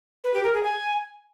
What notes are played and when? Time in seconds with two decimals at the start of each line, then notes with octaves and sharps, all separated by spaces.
0.24 B4
0.34 G4
0.44 A#4
0.54 G#4
0.63 G#5